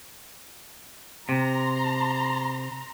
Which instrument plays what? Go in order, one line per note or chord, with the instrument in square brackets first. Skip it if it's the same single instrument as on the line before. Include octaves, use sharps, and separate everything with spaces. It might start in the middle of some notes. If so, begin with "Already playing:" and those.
[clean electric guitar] C3 [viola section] A#5 C6